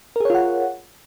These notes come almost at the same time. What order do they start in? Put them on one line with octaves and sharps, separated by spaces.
A#4 G#4 C#5 F4 F#5